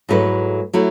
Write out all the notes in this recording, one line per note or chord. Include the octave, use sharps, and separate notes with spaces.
G#2 F#3 A3 E4 B4
F#3 A3 E4